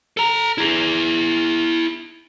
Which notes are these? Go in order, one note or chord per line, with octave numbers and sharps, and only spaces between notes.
A4 A#5
E4 G#4